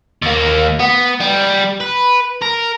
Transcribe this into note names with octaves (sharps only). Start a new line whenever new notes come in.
D#2 A#3
B3
G3
B4
A#4